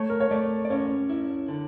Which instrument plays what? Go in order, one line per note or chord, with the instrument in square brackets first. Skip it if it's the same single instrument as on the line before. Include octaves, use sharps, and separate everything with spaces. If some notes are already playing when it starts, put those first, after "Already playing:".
Already playing: [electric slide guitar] A3 [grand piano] C#5
[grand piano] A#4
C#5
[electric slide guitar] A3 [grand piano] D5
[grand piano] D5
[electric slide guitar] C#4 [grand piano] C#5
[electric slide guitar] E4
D3